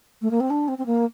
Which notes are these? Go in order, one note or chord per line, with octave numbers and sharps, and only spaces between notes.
A3
A#3
C4
D4
C4
C4
A#3